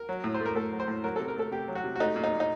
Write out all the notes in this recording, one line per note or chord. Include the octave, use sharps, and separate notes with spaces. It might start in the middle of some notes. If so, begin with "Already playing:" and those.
Already playing: A#4
F#3
A2
C5
A3
A#4
A2 A4
F#3
C5
A2
F#3 A#4
C3 A4
A#4
A3 A4
C3 G4
F#3
F#4
C3
F#4
A3 D#4
A#2
D#4
A#2
D#4